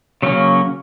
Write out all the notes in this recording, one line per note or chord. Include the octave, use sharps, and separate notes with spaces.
C#3 F#3 A#3 C#4